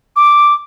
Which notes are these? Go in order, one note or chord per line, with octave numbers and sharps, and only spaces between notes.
D6